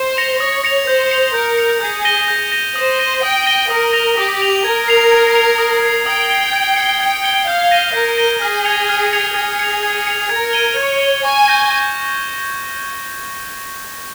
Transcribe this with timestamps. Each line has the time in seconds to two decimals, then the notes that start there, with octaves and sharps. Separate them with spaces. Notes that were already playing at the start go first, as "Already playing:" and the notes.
Already playing: C5
0.17 A#6 C#7 F7
0.40 C#5 D#6
0.64 A#6 C#7 F7
0.87 C5 G6
1.11 C#7 F7
1.34 A#4 G6
1.58 C#7 F7
1.81 G#4 G6
2.05 A#6 D#7 G7
2.28 G6
2.52 A#6 D#7 G7
2.76 C5 D#6
2.99 A#6 D#7 G7
3.23 G5 D#6
3.46 A#6 D#7 G7
3.70 A#4 D#6
3.93 A#6 F7
4.17 G4 D#6
4.41 A#6 F7
4.64 A#4 G#6
4.88 C7 F7
5.12 G#6
5.35 C7 F7
5.58 D#6
5.82 G#6 C7
6.06 G5 D#6
6.30 G#6 C7
6.53 G#6
6.76 C#7 G7
7.00 G5 G#6
7.24 C#7 G7
7.47 F5 G6
7.71 A#6 D#7 G7
7.94 A#4 G6
8.18 A#6 D#7 G7
8.42 G#4 F6
8.65 G#6 C#7 F7
8.89 F6
9.13 G#6 C#7 F7
9.35 G#4 G#6
9.59 C#7 F7
9.83 G#6
10.07 C#7 F7
10.29 A#4 G#6
10.53 D#7 G7
10.77 C#5 G#6
11.00 D#7 G7
11.24 G#5 C#6
11.48 G6 A#6
11.72 C#6